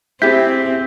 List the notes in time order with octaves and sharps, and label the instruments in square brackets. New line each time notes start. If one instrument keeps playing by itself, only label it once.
[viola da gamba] C4 [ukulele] E4 G4 G#4 [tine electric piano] E5 G6 B6